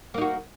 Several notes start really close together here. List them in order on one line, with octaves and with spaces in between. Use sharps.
A#3 D#4 F#4